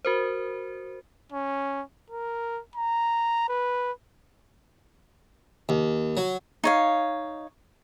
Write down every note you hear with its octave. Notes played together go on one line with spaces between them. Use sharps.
F#4 A#4 C5
C#4
A#4
A#5
B4
D#2
F#3
D#4 C#5 F5